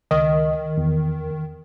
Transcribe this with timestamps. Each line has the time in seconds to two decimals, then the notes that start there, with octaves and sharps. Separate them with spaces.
0.11 C#2 D#3 D#5
0.77 E2